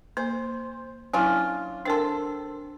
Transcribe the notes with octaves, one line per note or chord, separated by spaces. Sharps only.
A#3 C5
F#3 C#4 D4 E4 F4
C4 D4 A4 A#4 C6